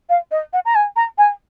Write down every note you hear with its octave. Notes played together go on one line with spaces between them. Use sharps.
F5
D#5
F#5
A#5
G#5
A#5
G#5